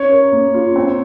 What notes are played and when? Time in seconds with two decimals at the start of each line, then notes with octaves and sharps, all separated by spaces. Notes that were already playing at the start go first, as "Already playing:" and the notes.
Already playing: C#4 C#5
0.11 A#4
0.32 A#3
0.54 F4
0.76 C4